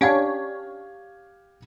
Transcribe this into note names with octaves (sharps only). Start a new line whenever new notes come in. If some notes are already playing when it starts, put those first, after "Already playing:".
C#4 D4 G4 C#5 F5 G#6